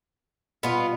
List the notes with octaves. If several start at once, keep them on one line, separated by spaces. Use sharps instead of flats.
B2 G3 B3 F4 D#5